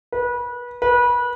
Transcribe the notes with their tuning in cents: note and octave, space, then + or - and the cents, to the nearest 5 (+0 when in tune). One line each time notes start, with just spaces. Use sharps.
B4 -30
B4 -30